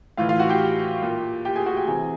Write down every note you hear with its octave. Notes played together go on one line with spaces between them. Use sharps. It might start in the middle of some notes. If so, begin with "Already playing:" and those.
A2 E3 F4 F5
F4 F5
F#4 F#5
G4 G5
A#2
G4 G5
G#4 G#5
F#4 F#5
G4 G5
C3 E3 G#4 G#5